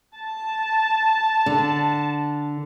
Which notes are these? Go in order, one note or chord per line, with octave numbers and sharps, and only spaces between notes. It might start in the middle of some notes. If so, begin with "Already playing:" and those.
A5
D3